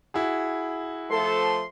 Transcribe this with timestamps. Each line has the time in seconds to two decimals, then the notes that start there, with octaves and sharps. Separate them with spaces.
0.14 E4 F#4 G#4
1.11 F3 A3 A4 C6